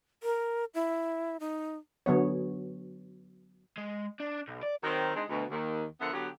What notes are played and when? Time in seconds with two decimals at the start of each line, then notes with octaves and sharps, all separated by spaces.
0.23 A#4
0.74 E4
1.40 D#4
2.06 D3 F#3 B3 C#5
3.77 G#3
4.20 D4
4.48 B1
4.63 D5
4.83 D#3 F#3 C4
5.15 G#3 C4 D4 D#4
5.29 D2 B2
5.49 D#2 D#3
6.01 D3 F3 B3 A#4 E5 F#5
6.13 D3 F#3 B3 G4